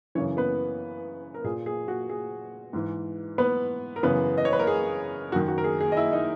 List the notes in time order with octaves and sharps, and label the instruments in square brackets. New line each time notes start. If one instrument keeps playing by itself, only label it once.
[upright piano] F#2 C#3 E3 C#4 C#5
B3 B4
A#4
A#2 G#4
G#4
F#4
G#4
G#2 E3
B3 B4
A#4
F#2 C#3 E3 B3 B4
D#5
C#5
B4
A#4
G#4
F#2 F#4
D#3
F#4
A#4
G#4
G#4
D#5
E4 E5
D#4 D#5